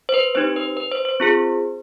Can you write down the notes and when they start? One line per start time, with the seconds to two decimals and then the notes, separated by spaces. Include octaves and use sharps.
0.09 C5
0.14 B4
0.35 C4 D#4 G4 C5
0.56 B4
0.77 B4
0.92 C5
1.05 C5
1.20 C4 F4 G#4